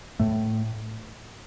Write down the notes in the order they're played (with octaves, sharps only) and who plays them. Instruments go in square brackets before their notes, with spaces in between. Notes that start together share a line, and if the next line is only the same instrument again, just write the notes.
[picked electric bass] A2 A3